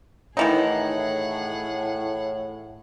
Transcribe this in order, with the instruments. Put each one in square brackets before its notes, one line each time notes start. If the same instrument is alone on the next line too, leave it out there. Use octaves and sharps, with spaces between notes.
[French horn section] A2 [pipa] D#3 E3 D#4 [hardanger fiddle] G#4 F#5